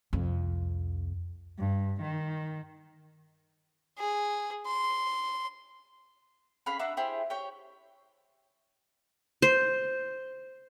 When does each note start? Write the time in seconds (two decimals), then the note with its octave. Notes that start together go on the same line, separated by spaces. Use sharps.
0.13 C2 F2
1.59 G2
2.02 D#3
3.98 G#4
4.67 C6
6.66 C#4 G#4 F5 B5
6.79 D4 F#4 E5 A#5
6.97 E4 G4 G#4 C5
7.30 G4 C#5 G5
9.42 C5